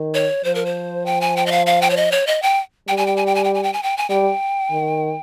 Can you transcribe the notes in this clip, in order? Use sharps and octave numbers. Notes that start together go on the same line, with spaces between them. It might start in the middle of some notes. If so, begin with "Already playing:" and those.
Already playing: D#3
C#5
F3 C5
A#4
C5
G5
G#5
G5
D#5
F5
F5
G5
C#5
D#5
C#5
D#5
G5
G3 G5
G#5
G5
G#5
G5
G#5
G5
G#5
G5
G#5
G5
G#5
G3 G5
D#3